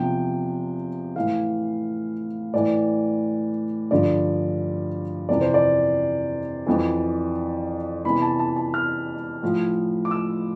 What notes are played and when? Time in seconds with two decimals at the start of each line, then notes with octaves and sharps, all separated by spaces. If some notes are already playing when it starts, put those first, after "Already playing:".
Already playing: E2 C3 F3 G5
1.16 A2 E3 F5
2.54 A2 E3 D5
3.91 G2 D3 F3 D5
5.29 F2 C3 E3 D5
5.41 C5
5.54 D5
6.67 F2 E3
8.05 E2 C3 E3 B5
8.22 A5
8.40 A5
8.56 A5
8.74 F6
9.43 A2 F3
10.05 D6
10.11 E6